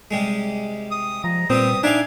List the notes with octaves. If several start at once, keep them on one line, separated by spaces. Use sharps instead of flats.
C3 G3 G#3
D#6
F3 A#5
A#2 G3 B3 C4 D#6
D4 D#4 E5 F5 G5 G#5